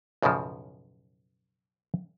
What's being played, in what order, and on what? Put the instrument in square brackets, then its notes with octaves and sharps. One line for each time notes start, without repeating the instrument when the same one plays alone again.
[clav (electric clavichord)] B1 F#2 A2 C#3 F3